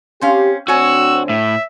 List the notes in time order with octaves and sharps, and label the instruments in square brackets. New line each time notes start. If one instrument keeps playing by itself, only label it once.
[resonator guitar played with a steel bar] C4 C#4 F5 [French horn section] G4
[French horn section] D2 C4 D4 [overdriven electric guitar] F#4 [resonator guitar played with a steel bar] C#5 G#5 [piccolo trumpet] E6
[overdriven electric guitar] A2 [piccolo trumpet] E5